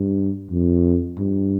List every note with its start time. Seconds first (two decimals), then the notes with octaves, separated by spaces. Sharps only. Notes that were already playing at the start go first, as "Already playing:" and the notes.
Already playing: G2
0.51 F2
1.19 G2